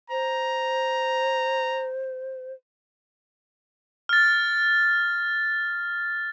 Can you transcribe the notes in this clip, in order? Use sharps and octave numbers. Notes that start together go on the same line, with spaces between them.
C5 A#5
F6 A6